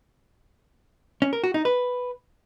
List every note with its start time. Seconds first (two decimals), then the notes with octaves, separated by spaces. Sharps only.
1.22 C#4
1.33 A#4
1.44 F#4
1.54 D#4
1.65 B4